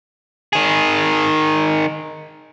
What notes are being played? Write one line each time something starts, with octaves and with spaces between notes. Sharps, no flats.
D#3 G#4